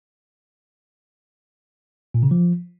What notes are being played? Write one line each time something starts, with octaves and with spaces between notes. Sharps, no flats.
A#2
C#3
F3